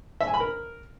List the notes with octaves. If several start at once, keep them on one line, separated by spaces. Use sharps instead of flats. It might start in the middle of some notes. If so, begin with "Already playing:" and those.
E5
G#5
B5
A#4